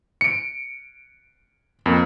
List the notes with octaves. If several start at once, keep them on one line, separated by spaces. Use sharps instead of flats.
C#7 D7
F2 A#3